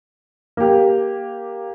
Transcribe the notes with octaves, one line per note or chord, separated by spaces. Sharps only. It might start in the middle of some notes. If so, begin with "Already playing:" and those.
A#3 G4